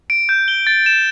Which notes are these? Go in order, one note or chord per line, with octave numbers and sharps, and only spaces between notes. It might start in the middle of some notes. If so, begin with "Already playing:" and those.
D7
G6
G7
A6
E7